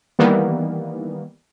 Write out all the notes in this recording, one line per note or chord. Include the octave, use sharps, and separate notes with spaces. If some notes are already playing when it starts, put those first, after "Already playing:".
D#3 E3 G3 A#3 B3